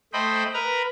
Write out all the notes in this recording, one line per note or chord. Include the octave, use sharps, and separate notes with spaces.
A3 C5 D#5 G5 B5
A#4 B4 A#5